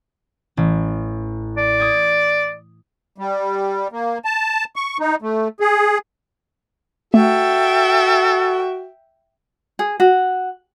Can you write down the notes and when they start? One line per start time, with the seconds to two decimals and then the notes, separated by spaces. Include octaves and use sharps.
0.57 A1
1.57 D5
1.80 D#6 G#6
3.18 G3
3.92 A#3
4.25 A5
4.76 C#6
5.00 D#4
5.22 A3
5.60 G#4
7.14 A3 F#4 A4 E5 G5
9.79 G#4
10.00 F#4